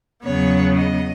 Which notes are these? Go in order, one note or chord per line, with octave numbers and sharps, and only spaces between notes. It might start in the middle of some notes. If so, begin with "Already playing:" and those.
E2 C#3 F#3 B3 C#5
D#5